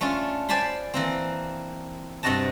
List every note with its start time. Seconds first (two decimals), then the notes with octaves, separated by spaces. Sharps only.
0.01 A3 C#4 D4 F4
0.49 C5 D5 G#5 A5 B5 C6
0.94 E3 A#3 C4
2.23 G2 C3 C4 F#4 D#5 A5